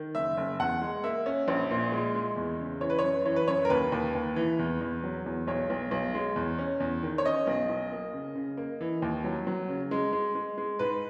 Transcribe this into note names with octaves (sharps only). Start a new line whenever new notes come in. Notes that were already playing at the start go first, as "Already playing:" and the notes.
Already playing: D#3
F#1 E5
F#1
E2 F#5
G#3
A#3 E5
C#4
A#1
A#2
G#3
G#3
E2
C#3
E3 C#5
B4
F#2 C#5
E3 C#5
B4
F#2 C#5
A#4
D#2 B4
D#2
D#2
E3
E2
E2
F#3
E2
B1 C#5
B1
B1
G#3
E2
C#4
E2
D#3
C#5
C#4 D#5
B1
B1
A#3
C#3
C#3
A#3
E3
D#2
F#3
F#3
C#3
G#3
G#3
G#3
G#3
G#2 B4